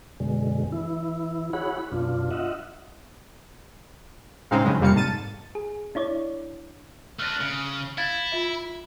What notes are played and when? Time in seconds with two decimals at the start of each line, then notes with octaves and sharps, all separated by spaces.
0.20 F#2 B2 D3 G#3
0.72 E3 E4
1.53 E4 F#4 G#4 C#5 F#5 B5
1.92 F#2 B2 D4 F4
2.31 F4 D#5 E5 F#5
4.51 A2 C#3 G#3 C4 D#4 F5
4.64 G2 C#3 F#3 G#3
4.80 F2 C3 G3 A#3 F5 C#7
4.95 G#2 A5 A6 D#7
5.55 G#4
5.95 D4 E4 C#5 D5
7.19 A3 D4 F6 F#6 A#6
7.41 C#3
7.98 E4 F5 G#6 A6
8.32 F4 E5